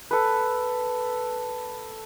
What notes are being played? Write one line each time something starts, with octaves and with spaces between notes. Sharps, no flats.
A4 B4